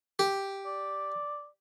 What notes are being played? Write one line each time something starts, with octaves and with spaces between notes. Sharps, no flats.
G4
D5